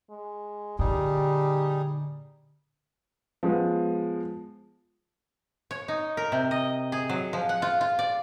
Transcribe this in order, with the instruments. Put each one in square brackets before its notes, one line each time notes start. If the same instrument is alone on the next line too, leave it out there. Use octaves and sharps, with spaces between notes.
[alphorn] G#3
[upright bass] A#2 D3 [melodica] G3 D#4 G#4 [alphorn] G4
[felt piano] F3 G#3 B3
[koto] C#5
D#4
A#4
C3
D#5
G#4
F#3
F3
F#5
F4
F4
D5